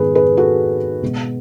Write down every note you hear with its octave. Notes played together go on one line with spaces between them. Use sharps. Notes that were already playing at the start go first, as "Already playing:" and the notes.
Already playing: G#2 D#3 G#3 B3 G#4 B4
G#4 B4
F#4 A4
B2 G#3 B3